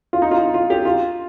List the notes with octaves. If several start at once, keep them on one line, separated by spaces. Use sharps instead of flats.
F4
D#4
F4
D#4
F4
G4
F4